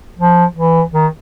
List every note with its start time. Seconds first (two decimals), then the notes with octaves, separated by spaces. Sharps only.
0.19 F3
0.56 E3
0.93 D#3